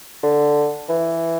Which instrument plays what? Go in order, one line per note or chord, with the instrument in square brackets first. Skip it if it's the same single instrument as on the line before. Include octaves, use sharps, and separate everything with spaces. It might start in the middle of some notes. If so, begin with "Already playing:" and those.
[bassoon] D3
E3